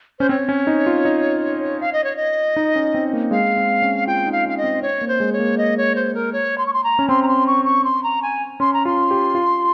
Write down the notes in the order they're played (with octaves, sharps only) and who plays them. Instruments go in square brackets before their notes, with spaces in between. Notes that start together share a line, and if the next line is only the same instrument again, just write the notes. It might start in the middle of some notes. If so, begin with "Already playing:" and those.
[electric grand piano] C#4 [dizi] C5
[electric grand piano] C4 [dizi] C#5
[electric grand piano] C#4
D#4
F4
D#4
[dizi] F5
D#5
C#5
D#5
[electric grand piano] D#4
C#4
C4
A#3
[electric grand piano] G#3 [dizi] F5
[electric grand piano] C4
C#4
[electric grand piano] F4 [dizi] G5
[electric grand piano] D#4
[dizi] F5
[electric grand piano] C#4
[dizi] F5
D#5
[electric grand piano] C4
[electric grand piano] C4 [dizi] C#5
[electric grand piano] A#3
[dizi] C5
[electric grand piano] G#3
[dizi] C#5
[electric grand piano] A#3
[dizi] D#5
C#5
C5
A#4
C#5
C6
C#6
C6
A#5
[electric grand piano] C#4
[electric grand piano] C4 [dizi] C6
[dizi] A#5
C6
C#6
C#6
C6
A#5
G#5
[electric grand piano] C#4 [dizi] C6
[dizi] A#5
[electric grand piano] F4 [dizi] C6
[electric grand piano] G4
F4